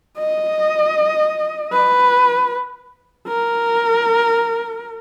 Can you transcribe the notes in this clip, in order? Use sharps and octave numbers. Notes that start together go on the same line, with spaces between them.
D#5
B4
A#4